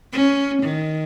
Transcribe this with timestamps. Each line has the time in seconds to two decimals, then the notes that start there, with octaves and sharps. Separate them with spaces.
0.13 C#4
0.63 D#3